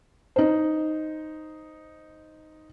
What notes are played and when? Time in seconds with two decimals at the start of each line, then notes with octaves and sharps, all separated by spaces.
0.36 D#4 C5